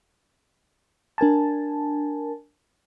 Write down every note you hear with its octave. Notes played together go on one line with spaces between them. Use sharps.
D4 A#4 G#5 A5